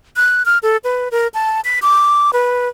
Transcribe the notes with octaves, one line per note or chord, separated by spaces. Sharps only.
F#6
F6
A4
B4
A#4
A5
B6
D6
B4